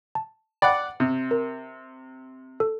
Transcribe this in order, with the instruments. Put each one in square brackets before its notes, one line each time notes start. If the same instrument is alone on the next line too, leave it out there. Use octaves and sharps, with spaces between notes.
[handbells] A5
[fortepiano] D5 F#5 [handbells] G5 B5
[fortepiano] C3
[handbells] A#4
A4